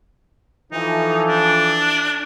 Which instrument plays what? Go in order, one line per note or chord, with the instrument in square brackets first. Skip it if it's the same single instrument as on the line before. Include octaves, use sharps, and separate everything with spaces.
[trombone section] E3 F3 A4 [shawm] D#4
[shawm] D4